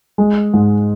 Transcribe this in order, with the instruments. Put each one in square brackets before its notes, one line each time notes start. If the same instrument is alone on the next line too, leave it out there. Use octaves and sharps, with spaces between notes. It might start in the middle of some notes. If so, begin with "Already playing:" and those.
[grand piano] G#3
G#2